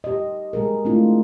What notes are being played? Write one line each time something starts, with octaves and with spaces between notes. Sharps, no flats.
G4 D#5
G#3 G#4 A#4
A3 C4 D4 E4 F4